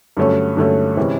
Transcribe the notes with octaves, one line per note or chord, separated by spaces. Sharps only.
G2 D3 F#3 A3 C#4
G2 D3 F#3 A3 C#4
C3 E3 G#3 C#4